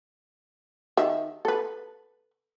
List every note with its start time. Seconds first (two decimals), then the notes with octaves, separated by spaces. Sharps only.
0.97 D#3 E5
1.45 A4 B4